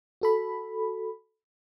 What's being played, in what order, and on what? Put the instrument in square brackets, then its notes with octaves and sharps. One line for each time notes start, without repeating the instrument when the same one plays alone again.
[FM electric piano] F#4 A4 B5